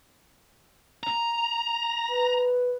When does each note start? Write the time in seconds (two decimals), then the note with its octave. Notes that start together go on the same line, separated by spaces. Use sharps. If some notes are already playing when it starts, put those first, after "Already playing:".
1.03 A#5
2.10 B4